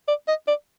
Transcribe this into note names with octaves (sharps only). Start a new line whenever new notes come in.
D5
D#5
D5